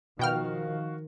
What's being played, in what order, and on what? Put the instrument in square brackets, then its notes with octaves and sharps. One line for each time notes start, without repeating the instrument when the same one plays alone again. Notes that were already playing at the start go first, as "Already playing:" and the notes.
[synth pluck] B2 G5 F6 [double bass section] D#3 F3 [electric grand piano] F#4 F5